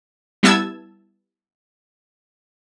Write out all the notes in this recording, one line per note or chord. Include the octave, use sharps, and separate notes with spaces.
G3 B3 E4 A5 E6 G#6